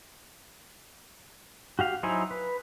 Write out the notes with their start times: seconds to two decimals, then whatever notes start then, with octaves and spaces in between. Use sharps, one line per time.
1.79 F#4 G4 F5
2.03 F#3 D#4 E4 C5 G#5
2.31 B4